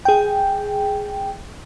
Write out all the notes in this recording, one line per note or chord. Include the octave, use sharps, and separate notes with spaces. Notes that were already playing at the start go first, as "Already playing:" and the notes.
G#4 G5